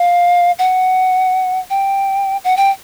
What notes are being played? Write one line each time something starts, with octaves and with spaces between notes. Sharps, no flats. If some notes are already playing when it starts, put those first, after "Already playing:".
Already playing: F5
F#5
G5
F#5
G5